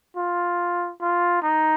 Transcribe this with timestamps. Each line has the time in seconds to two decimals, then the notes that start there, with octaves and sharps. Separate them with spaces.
0.17 F4
1.01 F4
1.42 D#4